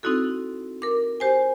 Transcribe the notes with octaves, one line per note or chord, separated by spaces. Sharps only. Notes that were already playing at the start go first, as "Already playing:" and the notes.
C4 D#4 E4 F#4 A4
A#4 D6
G4 C5 G#5